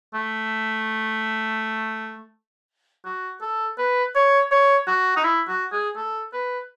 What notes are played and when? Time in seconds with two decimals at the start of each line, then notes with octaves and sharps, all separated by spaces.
0.14 A3
3.05 F#4
3.42 A4
3.78 B4
4.15 C#5
4.51 C#5
4.87 F#4
5.17 D#4
5.24 E4
5.48 F#4
5.72 G#4
5.96 A4
6.33 B4